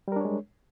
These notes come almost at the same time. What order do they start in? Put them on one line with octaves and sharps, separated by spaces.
G3 A#4 D4 C#5 G#3